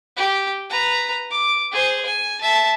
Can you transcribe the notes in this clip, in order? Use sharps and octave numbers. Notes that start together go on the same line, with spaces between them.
G4
B4 A#5
D6
G#4 C5
G#5
E5 A5